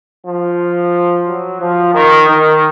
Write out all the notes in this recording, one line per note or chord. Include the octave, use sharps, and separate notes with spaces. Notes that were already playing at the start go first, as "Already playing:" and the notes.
F3
F#3
F3
D#3
D#3